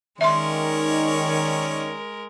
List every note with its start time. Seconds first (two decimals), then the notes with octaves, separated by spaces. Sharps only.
0.21 D#3 G#3 C#4 A#4 C#5 D5 E5 C6